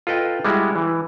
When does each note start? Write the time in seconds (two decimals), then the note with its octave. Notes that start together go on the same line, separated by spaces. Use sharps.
0.07 F4 A4 B4 D#5 G5
0.45 G3 G#3 E4 F#4
0.76 E3